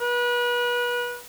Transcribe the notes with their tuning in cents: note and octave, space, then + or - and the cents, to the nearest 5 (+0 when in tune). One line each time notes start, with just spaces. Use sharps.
B4 -30